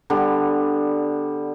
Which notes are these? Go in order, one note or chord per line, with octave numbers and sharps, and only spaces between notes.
D3 G3 B3